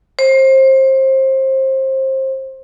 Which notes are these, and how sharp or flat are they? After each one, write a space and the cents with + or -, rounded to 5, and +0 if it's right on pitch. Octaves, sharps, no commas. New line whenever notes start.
C5 +25